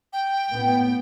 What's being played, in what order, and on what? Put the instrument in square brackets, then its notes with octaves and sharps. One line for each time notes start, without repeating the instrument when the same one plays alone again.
[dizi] G5
[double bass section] A2 B3